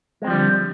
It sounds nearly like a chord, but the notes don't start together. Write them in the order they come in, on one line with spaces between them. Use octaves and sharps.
G#3 C4 F3 G3 D3